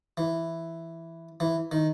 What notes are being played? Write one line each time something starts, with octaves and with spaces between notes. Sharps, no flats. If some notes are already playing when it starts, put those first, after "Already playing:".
E3
E3
D#3